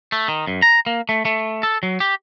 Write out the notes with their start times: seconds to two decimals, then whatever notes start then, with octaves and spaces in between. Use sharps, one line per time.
0.12 A3
0.28 D#3
0.47 F#2
0.62 A#5
0.86 A#3
1.09 A3
1.25 A3
1.63 A4
1.83 F#3
2.00 G4